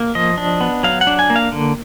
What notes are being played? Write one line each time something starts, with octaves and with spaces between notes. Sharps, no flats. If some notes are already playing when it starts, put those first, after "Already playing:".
Already playing: A#3
F3 D#5
D4
B3
F#3 F5
F#5
D4
G#5
A#3
F5
D3